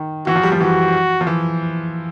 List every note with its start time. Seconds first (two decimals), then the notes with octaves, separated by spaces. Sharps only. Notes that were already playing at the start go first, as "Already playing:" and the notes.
Already playing: D#3
0.27 E3 F#4
0.36 F3
0.43 G3
0.52 F3
0.60 E3 F#4
1.21 F3
1.27 E3